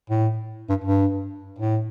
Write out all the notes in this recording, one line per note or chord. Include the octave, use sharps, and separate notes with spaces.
A2
G2
G2
A2